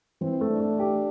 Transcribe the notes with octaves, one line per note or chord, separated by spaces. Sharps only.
E3 C4
A3
D4
A3
G4